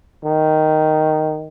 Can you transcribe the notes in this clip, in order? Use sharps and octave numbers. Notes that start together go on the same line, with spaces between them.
D#3